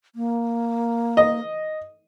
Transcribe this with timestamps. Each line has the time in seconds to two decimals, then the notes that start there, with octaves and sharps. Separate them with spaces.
0.16 A#3
1.17 D#5